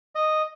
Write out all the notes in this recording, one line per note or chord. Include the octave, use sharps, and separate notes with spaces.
D#5